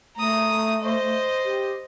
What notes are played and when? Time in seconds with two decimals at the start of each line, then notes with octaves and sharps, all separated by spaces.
0.17 A3 A#5 D#6
0.81 C5 D#5
1.45 G4